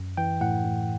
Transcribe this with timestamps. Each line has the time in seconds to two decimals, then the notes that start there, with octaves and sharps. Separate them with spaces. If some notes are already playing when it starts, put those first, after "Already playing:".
Already playing: F#2
0.17 E3 G5
0.41 A2 F#5
0.64 A2